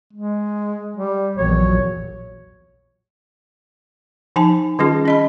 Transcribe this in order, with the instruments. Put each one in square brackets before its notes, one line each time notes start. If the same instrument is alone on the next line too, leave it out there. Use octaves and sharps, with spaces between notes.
[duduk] G#3
G3
[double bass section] A#1 E2 F#3 [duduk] C#5
[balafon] F3 D#4 G#5 A5
D#3 G3 C#4 F4 G#4
C#4 D#5 B5